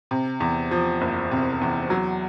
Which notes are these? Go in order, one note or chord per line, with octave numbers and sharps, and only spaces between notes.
C3
E2
F3
F#1
C3
E2
F#3